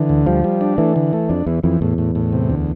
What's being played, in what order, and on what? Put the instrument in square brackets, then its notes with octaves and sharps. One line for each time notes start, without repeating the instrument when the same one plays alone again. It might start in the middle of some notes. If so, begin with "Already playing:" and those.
Already playing: [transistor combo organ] D3 [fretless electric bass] E3
[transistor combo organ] D2
[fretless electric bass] F3 [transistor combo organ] G3
[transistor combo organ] G3
D4
[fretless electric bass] E3 [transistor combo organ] A3
[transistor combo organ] D3
A3
[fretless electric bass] F2 [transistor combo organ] D4
[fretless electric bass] E2 [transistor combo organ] E3
[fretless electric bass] F2 [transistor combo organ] E3
[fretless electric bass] E2 [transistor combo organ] A2
[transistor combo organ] A2
A2
C3
D2